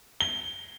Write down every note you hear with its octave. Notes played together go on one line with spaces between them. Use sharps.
G7